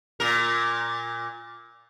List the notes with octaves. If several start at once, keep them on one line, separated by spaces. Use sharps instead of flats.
A#2 A#4